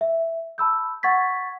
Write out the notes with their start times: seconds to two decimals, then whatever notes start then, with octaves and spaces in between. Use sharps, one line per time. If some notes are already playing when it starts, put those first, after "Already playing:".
0.01 E5
0.58 A5 B5 E6 G6
1.03 F#5 C#6 G#6 A6 B6